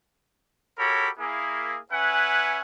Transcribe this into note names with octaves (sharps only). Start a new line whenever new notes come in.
F#4 G4 A4 A#4 C#5 B5
A#3 E4 G#4
C#4 B4 E5 F#5 G#5